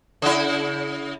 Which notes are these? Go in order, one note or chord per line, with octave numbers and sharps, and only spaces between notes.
C#3 E4